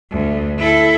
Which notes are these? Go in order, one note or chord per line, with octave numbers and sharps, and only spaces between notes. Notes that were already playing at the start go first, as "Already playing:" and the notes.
D2
E4 A4